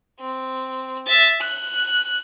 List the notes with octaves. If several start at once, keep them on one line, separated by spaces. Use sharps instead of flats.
C4
E5 A6
F#6